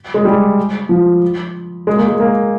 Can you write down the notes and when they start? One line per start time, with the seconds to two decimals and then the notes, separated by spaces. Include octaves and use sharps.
0.14 G#3
0.25 G3
0.89 F3
1.87 G#3
1.98 A#3
2.08 G#3
2.20 A#3